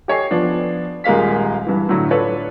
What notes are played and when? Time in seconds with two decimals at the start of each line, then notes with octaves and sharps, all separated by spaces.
0.08 G4 A4 C#5 D#5 G#5 C7
0.31 F3 B3 D4
1.04 D#1 G#3 A#3 F5 B6
1.66 G2 E3
1.89 A2 D3 F#3
2.11 D4 F4 A4 B4 C#5